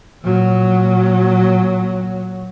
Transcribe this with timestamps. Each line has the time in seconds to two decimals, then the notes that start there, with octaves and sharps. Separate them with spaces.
0.23 A#2 F#3